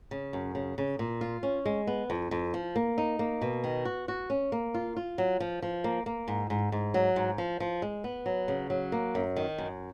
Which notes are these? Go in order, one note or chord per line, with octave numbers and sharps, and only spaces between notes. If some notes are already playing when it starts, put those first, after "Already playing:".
C#3
F#2
C#3
C#3
A#2
F4
C#4
G#3
B3
F2
F2
F3
A#3
D#4
A#3
B2
D#3
F#4
F#4
C#4
A#3
F4
F4
F#3
F3
F3
A#3
A#3
G#2
G#2
G#2
F#3
G#2
F3
F3
G#3
B3
F#3
C#3
F#3
A#3
F#2
D#3
F#2